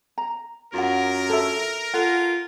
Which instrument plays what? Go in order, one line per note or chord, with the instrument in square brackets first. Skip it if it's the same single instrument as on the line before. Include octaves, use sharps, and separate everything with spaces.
[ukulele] A#5
[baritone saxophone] F#2 [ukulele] F4 F#5 [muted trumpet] A#4
[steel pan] A4 E5
[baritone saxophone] F4 [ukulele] A4 [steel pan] F#5